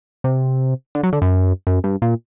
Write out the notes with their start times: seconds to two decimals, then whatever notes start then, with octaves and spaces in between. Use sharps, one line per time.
0.24 C3
0.95 D3
1.03 F#3
1.13 D3
1.22 F#2
1.67 F#2
1.84 G2
2.02 A#2